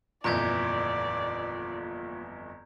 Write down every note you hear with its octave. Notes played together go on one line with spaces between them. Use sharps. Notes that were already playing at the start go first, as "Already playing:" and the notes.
G1 F2 A#2 E3 D5 A#5 G6 G#6